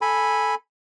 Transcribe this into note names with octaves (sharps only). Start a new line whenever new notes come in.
A4 G#5 B5